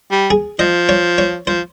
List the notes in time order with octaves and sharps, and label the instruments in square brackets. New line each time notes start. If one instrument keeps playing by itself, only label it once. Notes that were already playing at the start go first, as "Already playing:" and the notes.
[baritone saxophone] G3
[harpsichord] G#4
[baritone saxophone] F3 [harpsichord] D#5
[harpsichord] C#5
C#5
[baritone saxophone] F3 [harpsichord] C5